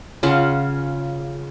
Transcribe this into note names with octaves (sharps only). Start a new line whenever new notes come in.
C#3 F4 F#5